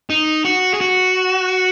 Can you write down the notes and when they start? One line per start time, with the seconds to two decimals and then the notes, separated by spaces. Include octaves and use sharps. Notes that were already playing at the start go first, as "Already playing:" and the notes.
0.10 D#4
0.45 F#4
0.74 G#4
0.81 F#4